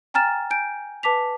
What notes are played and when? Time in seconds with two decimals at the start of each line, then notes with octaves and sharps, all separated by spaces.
0.14 G5 G#5 A#5 F6 A6 E7
0.50 G#5 G6 D7
1.03 B4 A5 D6 B6 F7